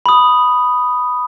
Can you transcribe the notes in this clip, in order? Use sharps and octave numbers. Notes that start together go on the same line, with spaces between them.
B5 D#6